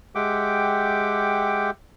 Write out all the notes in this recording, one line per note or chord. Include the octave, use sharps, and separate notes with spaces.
G#3 G4 E5 F#5 G5 D6